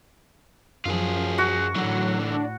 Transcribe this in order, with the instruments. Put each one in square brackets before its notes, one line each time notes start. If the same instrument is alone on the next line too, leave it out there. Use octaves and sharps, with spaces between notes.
[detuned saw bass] F#2 [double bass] F3 [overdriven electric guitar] F4 G#4
[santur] F#4
[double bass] A2 [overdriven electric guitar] D3 E3 [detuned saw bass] F#3
[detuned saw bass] D4